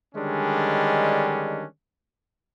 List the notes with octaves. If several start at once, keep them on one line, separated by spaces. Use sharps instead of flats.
D3 D#3 G3 G#3 C#4 D4